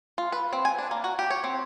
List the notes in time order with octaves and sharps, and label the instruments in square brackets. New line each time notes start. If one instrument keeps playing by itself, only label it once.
[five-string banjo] F4
B4
C4
G#5
D4
A#3
F#4
G4
C#5
C4